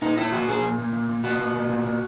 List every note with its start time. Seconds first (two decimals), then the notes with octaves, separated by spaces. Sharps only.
0.02 A#2 D#4
0.17 A#2 E4
0.32 A#2 F#4
0.48 A#2 G#4
0.63 A#2
0.78 A#2
0.93 A#2
1.09 A#2
1.24 A#2 F#4
1.39 A#2
1.54 A#2
1.69 A#2
1.84 A#2